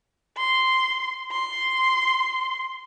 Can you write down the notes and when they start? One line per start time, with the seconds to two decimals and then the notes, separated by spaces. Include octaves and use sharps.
0.37 C6
1.31 C6